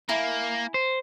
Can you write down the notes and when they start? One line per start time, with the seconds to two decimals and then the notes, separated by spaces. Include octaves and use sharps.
0.09 A#3 E4 G#5
0.74 C5